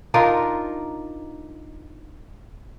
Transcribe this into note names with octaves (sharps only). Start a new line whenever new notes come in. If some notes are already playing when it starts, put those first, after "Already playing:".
D4 D#4 F4 A#4